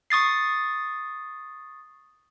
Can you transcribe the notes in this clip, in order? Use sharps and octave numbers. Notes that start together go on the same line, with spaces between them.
C#6 D#6 A6 C7